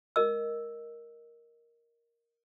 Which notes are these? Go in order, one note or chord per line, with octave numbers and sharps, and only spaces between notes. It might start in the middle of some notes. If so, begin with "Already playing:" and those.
A#4 D#5 E6